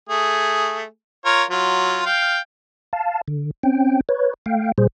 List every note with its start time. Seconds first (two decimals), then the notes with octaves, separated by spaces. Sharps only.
0.09 A3 G#4
1.25 F4 A#4 C#5
1.50 F#3 F4
2.06 F5 G5
2.93 F5 A5
3.28 D3
3.63 C4 C#4 G5
4.09 B4 C#5
4.46 A3 F5 G5
4.78 A#2 G3 G#4 C5